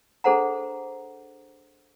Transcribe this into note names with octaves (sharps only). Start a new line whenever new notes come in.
D4 G#4 A4 C5 F#5 A#5